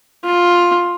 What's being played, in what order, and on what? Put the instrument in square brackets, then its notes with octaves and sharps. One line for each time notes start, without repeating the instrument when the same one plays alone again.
[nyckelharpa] F4